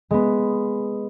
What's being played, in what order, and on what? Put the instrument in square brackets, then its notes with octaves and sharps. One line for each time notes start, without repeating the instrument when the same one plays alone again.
[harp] G#3 B3